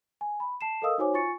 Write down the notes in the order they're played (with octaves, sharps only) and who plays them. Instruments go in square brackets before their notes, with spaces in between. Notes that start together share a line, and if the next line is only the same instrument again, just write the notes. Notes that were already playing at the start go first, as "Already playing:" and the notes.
[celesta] G#5
B5
A5 C7 E7
A4 A#4 D#5 F5 D#6 E6
D#4 F#4 C5 C#5 G#5 D6
F4 G#5 C#6 A6 C#7